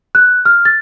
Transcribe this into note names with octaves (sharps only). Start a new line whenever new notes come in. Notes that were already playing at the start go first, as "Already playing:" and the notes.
F#6
F6
A6